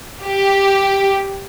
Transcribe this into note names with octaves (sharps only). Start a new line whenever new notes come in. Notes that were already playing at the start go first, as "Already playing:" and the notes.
G4